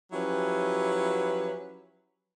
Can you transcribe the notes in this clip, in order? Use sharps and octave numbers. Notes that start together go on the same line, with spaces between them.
F3 F#3 C#4 E4 G4 B4